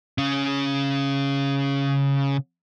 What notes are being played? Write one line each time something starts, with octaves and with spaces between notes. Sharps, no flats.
C#3 C#4